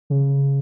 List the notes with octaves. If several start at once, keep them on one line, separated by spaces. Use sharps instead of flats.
C#3